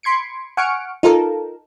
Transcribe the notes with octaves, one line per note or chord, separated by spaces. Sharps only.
B5 C6 G#6 C#7 D7
F#5 G#5 C#6 F6 C#7 D7
D#4 F4 A4 A#4